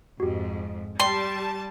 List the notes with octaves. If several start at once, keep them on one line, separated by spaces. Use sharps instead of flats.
F2 G#2 F#4 G4
G3 D5 G5 A5 C6